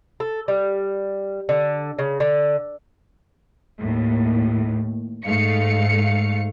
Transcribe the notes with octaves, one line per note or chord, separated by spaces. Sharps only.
A4
G3
D3
C#3
D3
D#2 A2
G#2 A3 F5 C#7